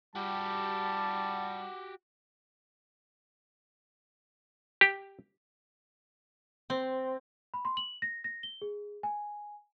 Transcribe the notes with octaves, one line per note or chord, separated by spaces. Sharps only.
G3 F#4 G4 A5
G4
C4
B5
C6
F#7
A#6
A#6
G7
G#4
G#5